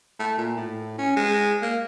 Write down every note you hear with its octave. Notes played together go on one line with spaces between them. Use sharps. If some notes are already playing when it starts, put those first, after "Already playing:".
A3
A#2
A2
C#4
G#3
A#3